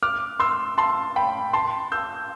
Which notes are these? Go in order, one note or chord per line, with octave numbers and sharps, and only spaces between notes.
D6 F6
C6 E6
A5 C6
G5 B5
A5 C6
E6 G6